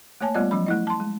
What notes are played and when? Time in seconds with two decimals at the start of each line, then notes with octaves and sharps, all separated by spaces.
0.21 A3 A#3 C#5 G#5 A5
0.34 G3 A3 B3 F4 D5 D#5
0.51 F3 F#3 C#4 B5
0.66 A3 E4 D#5
0.87 A5 C6
1.00 G#3